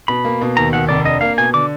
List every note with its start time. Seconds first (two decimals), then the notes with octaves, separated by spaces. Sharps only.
0.08 B2 B5
0.25 A#3
0.41 B2
0.56 D#2 A#5
0.73 D#2 F#5
0.89 F1 D5
1.05 D4 D#5
1.21 A#3 F5
1.38 B2 G#5
1.53 D3 D6